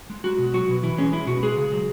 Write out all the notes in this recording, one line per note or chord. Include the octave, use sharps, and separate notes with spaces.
G#3
G#3 F#4
B2
F#3 F#4
B2
E3 E4
G#3 C#4
G#3 E4
B2 F#4
G#3 G#4
C#3
F#3